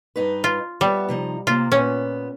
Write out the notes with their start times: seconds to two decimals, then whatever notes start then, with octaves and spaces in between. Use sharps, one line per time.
0.16 G2 D#4 B4
0.44 F4
0.81 G3 B3 E5
1.09 C3 F3 D#4
1.47 C3 A#3 F4
1.72 A#2 B3 C#4